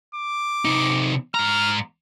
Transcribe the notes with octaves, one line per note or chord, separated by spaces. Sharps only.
D6
C3 D#4
G#2 A#5 F6